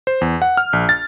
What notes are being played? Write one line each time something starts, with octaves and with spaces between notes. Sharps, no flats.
C5
E2
F#5
F6
A#1
A6